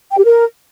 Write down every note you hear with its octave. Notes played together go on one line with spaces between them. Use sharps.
G5
G4
A#4